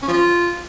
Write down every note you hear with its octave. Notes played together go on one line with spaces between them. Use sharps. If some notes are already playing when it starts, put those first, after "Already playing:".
C#4
F3
F4